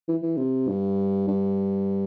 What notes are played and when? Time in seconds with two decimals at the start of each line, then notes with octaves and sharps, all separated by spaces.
0.08 E3
0.22 E3
0.38 C3
0.68 G2
1.28 G2